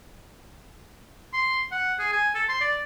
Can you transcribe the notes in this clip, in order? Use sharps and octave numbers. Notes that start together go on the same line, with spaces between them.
C6
F#5
G#4
G#5
A4
C6
D5